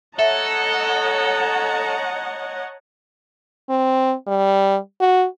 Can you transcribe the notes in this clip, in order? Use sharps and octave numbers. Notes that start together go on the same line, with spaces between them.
A4 C#5 D#5 E5 F#5 A5 A#5
C4
G3
F#4